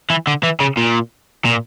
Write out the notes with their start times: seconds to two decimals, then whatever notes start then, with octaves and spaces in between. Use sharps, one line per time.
0.10 E3
0.27 D3
0.44 E3
0.60 C#3
0.77 A#2
1.45 A#2